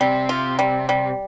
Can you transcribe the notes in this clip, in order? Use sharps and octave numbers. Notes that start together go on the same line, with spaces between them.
C3 G3
F4
G3
G3